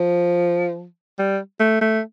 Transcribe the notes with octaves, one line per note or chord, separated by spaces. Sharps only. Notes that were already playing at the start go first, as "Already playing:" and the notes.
Already playing: F3
G3
A3
A3